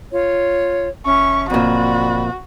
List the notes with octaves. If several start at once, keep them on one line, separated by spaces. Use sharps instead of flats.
F4 C#5
F#1 C#4 E5 C#6
F2 A#2 F#4 D5 B5